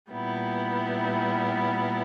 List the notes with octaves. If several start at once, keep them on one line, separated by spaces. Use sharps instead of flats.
A#2 G3 B3 E4